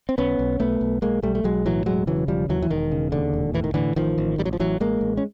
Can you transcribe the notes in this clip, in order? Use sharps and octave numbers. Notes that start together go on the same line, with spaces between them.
C4
B1 B3 C#4
B1
B1 A3 B3
B1
B1 G#3 A#3
B1 G3 A3
A3
B1 F#3 G#3
A2 E3 F#3
E1 F#3 G#3
C#3 E3 F#3
E1 F3 G3
D#2 E3 F#3
E3
E1 D#3
C#3
D#2 D3
E1
A2 E3
D#3
A2 D3 E3
A1 D#3 F3
A1
A1 G3
F#3
F3
A1 E3 F#3
A1 G#3 A#3
A1
C#4